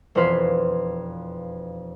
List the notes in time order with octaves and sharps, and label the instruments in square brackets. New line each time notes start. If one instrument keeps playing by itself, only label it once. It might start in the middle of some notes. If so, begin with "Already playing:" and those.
[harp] E1 F2 B4 C5 F5 B6